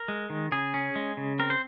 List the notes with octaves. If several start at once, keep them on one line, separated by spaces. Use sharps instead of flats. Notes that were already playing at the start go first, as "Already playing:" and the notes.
Already playing: A#4
G#3
D#3
C#3 G#4
C#4
G#3
C#3
C4 A#4
C5